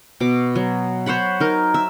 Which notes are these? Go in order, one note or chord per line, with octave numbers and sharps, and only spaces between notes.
B2 D6
F#3
C5 C#5 F#5 B5
D#4 A#4
E5